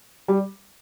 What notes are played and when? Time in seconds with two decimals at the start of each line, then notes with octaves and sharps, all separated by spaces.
0.28 G3